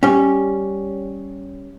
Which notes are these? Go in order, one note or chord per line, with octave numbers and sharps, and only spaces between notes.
G3 C#4